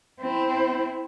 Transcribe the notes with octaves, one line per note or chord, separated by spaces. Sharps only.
C4 E4